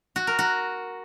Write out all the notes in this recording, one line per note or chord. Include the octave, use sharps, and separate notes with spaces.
F#4
A#4
F#4